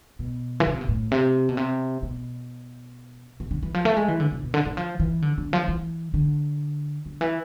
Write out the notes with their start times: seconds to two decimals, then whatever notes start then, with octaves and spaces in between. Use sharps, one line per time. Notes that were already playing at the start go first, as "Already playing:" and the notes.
0.19 B2
0.60 E3
0.67 D3
0.74 C3
0.81 B2
0.89 A2
1.11 C3
1.49 B2
1.57 C3
2.03 B2
3.40 C3
3.51 D3
3.63 E3
3.74 F3
3.85 A3
3.97 G#3
4.08 E3
4.20 D3
4.31 C3
4.43 B2
4.54 D3
4.65 E3
4.77 F3
5.00 E3
5.22 D3
5.38 D3
5.53 F3
5.68 E3
6.14 D3
7.06 D3
7.21 E3